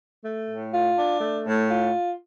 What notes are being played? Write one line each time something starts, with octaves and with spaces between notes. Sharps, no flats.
A3
A2
F4
D4
A3
A2
F4